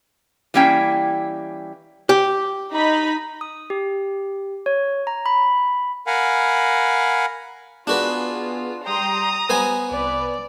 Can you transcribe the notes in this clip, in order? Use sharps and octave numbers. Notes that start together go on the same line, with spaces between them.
E3 G3 A#3 C#4 E4 G5
G4
D#4 B5
D#6
G4
C#5
A#5
B5
A#4 F5 F#5 G#5 B5
B3 D4 F4 F#4 G#4 B4
G3 G5 A#5 C6 D#6
G3 B3 C5 G#5
C2 B4 D5